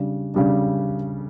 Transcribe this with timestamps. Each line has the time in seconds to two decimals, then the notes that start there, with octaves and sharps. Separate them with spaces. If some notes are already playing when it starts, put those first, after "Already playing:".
Already playing: C#3 G3 D4
0.34 C#3 G3 D4